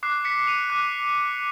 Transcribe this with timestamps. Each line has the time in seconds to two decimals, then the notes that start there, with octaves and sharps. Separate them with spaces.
0.03 D6 F#6 C7
0.25 B6 C#7
0.47 D#7 F7
0.70 D6 F#6